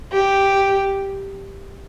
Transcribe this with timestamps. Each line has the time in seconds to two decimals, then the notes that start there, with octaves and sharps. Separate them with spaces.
0.13 G4